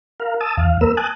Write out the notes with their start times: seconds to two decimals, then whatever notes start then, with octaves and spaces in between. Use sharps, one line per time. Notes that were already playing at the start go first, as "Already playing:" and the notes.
0.20 A#4 F5
0.41 A5 D#6 E6
0.57 E2 F5
0.81 A#3 A#4 B4 E6
0.97 G#5 A5 D#6 F#6